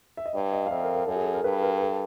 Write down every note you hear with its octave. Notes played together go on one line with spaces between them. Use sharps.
E5
D#5
G2 D5
D#5
F5
F2 E5
A#4
A#4
F#2 A4
G#4
A4
A#4
G2 B4
A#4
A4